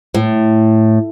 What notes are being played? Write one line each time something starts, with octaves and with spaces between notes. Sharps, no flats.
A2